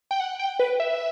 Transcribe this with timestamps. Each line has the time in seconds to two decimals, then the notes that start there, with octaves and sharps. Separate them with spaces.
0.11 G5
0.20 F#5
0.39 G5
0.59 B4
0.80 E5